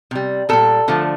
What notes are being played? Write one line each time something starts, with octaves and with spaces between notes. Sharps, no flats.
C3 G3
A#2 G3 A4
D3 F3 A3